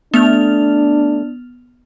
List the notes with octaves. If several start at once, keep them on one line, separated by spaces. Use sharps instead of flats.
A3 B3 D4 F6 F7